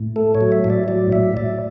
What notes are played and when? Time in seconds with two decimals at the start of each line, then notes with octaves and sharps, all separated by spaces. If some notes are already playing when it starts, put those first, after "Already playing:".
Already playing: A2
0.16 A3 A4
0.35 C#5
0.41 F#3
0.52 E5
0.64 A2
0.70 D5
0.88 F#3 D5
1.12 A2 E5
1.37 A2 D5